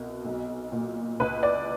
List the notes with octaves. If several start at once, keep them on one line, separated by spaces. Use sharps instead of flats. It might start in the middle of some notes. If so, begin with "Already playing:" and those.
Already playing: C2 B2
B1
A#2
C#2 B4
D5